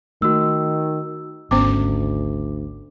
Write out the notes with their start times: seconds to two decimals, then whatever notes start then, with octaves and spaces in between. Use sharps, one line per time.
0.22 D#3 A3 F#4 E6
1.51 G#1 D2 B3 C#4 C5 D6